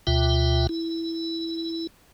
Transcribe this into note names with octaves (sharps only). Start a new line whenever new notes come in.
D2 B2 F4 E5 G5
E4